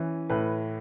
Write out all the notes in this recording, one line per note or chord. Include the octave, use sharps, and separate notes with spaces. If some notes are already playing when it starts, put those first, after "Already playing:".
Already playing: E3 C#4
A2 B4